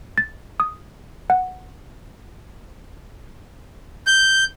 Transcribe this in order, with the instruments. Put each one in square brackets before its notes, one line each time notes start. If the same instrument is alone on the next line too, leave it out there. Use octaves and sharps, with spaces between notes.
[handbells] A6
D#6
F#5
[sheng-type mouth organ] G6